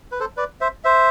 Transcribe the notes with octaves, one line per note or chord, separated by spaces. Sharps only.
B4
A4 C5
B4 D5
C5 E5
C5 E5